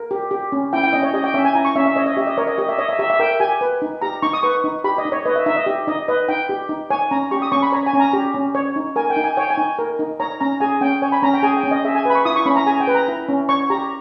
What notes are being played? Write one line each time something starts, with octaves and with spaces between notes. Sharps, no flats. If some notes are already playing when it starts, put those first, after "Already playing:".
Already playing: A#4
G4
G4
C#4
E4 G5
G5
C#4 D#5
C#5
G4 D#5
G5
C#4 E5
G#5
E4 A#5
C#6
C#4 E5
E5
C#5 D#5
D#5
G4 E5
D#5
A#4 C#5
D#5
G4 D#5
E5
C#5 D#5
E5
G4 E5
E5
A#4 G5
G4 G#5
B4
D#4
G4 A#5
D#4 C#6
D#6
B4 C#6
D#4
G4 B5
D#5
D#4
C#5
B4 D#5
E5
D#4 E5
D#5
G4
D#4 D#5
B4 D#5
D#4 G5
G4
D#4
C#5 G#5
C#4 A#5
G4 C#6
D#6
C#4 C#6
B5
C#5 A#5
G#5
C#4
A#5
G4
C#4
C#5
D#4
A#4 G#5
G5
D#4
G#5
C#5 G5
G#5
D#4
A#4
D#4
C#5 A#5
C#4 A#5
G#4 G#5
C#4 G5
C#5 G#5
B5
C#4 A#5
G5
G#4 G#5
G5
C#4
D#5
G#4 E5
G#5
B4 B5
C#6
E4 D#6
C#6
C#4 B5
A#5
G#4 G#5
G5
B4
A#5
E4
C#4
C#5 C#6
G4 A#5